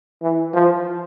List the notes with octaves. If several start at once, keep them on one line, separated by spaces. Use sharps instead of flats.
E3
F3